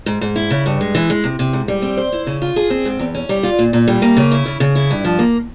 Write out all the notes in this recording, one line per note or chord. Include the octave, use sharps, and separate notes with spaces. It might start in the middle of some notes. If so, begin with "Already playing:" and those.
G#2
G#2
E4
C#3
G2
G#3
E3
G#3
C3
C3
G#2
G3
C4
C5
E4
C#3
F4
G#4
C4
G#2
E2
C#4
G3
F4
A#2
A#2
G3
A#3
C#3
E4
C#3
C#3
E4
G2
F3
A#3